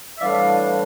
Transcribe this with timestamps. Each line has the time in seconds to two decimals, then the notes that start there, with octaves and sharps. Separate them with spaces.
0.17 E5
0.21 A2 E3 G3 D4 D5 F5